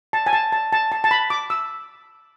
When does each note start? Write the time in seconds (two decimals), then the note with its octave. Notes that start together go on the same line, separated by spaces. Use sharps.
0.13 A5
0.26 G#5
0.33 A5
0.52 A5
0.73 A5
0.92 A5
1.04 A5
1.11 B5
1.30 D6
1.50 E6